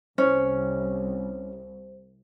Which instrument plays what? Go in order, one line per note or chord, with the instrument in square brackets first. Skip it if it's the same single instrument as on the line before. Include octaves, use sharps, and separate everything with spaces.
[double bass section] C2 [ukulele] C#4 [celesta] C5